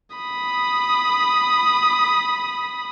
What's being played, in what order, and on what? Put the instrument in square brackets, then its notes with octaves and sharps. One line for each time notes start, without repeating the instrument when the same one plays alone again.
[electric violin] B5 D#6